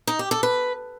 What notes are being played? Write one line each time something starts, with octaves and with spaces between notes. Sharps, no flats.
D#4
G4
A4
B4